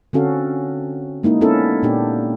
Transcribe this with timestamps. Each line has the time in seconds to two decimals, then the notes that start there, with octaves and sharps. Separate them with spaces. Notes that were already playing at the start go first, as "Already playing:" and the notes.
0.13 D3 C4 C#4 F#4 A4 F5
1.23 G#3 A#3 D#4 E4
1.41 B3 C#4 D4 E4 A4 A#4
1.83 A#2 A#3 D4 G4